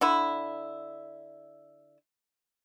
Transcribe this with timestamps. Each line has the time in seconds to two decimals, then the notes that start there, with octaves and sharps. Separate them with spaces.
0.01 D3 E4